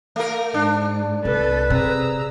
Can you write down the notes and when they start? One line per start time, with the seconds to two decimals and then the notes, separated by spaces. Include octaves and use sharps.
0.16 A3 A#4
0.54 G#2 D4
1.25 C2 A4 B4
1.70 C3 G#4 A#5 E6